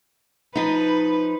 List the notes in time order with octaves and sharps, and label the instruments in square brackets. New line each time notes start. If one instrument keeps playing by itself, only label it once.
[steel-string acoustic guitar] F3 D#4 [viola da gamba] B4